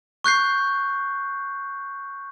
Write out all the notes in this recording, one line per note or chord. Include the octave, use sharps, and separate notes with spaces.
C#6 F#6 G6 C7